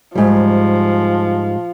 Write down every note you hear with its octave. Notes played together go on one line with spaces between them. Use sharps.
G#2 F3 G3